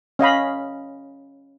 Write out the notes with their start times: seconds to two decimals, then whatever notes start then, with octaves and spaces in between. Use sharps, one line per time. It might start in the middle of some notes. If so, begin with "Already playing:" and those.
0.19 C#4 D#5 F5 B5